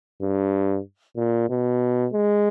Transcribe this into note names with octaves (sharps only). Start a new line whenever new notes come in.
G2
A#2
B2
G#3